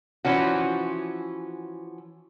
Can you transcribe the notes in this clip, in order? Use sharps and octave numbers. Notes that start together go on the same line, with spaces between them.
E3 F3 C#4 F#4